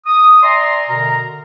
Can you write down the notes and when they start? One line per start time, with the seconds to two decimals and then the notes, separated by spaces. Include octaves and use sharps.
0.06 D#6
0.43 D5 E5 G#5 A#5 C6
0.89 B2 D3 A#4 A#5